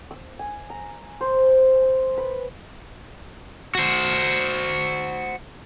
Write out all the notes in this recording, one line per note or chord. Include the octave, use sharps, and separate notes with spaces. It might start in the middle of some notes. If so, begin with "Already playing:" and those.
E6
G#5
A#5
C5
B4
F#4 C5